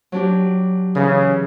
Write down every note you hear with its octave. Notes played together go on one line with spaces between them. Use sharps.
F#3 D4 G4
C#3 E3 D#6